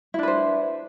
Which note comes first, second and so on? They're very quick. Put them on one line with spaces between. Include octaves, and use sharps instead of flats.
E4 D4 B4 C5